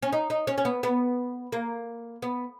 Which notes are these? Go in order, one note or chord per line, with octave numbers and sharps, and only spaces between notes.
C#4
D#4
D#4
C#4
C#4
B3
B3
A#3
B3